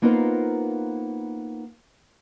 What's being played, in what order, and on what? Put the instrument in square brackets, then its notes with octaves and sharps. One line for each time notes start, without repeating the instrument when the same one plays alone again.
[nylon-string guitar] A#3 B3 D#4 F4 A#4 C5